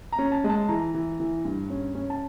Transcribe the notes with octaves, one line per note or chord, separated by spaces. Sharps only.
A#5
C#4
A5
G#3
A5
E3 A#5
E3
E3
G2
C#4
C#4
A5